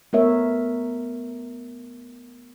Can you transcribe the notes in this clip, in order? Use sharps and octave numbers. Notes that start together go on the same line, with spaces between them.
A3 B3 A#4 C#5 E5